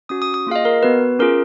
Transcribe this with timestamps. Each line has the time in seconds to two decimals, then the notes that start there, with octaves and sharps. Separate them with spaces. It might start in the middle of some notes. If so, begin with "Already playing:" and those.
0.09 C#4 F#4 D#6
0.22 D#6
0.34 D#6
0.47 A#3 F4 G#4 F5
0.56 D#5
0.65 A#4
0.83 B3 F#4 B4
1.19 C#4 F4 G#4 A#4